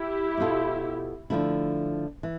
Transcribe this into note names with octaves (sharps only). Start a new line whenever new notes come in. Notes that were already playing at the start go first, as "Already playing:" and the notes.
Already playing: E4 G4
B2 B3 F4 A4
D3 F3 A3 E4
E3